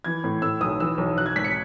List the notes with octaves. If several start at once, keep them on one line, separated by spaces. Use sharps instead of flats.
E3 G#6
A2
A2 E6
B1 D#6
E3 E6
B1
F#3 F#6
G#6
G#1 B6
C#7